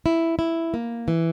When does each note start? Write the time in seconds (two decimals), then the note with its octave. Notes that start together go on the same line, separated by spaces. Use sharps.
0.06 E4
0.39 E4
0.74 A#3
1.08 E3